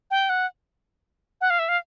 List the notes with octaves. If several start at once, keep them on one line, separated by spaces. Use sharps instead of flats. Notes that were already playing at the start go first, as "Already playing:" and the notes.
G5
F#5
F#5
F5
E5
F5